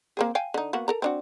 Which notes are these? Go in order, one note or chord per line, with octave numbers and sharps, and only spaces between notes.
A#3 C4 G#4
F5 G5 G#5
D3 D#4
A#3 B3 F#4
A4 A#4 A#5
C4 D4 F#4